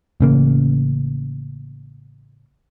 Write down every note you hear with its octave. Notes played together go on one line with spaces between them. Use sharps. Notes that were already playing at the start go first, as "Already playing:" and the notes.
A1 C#3 A#3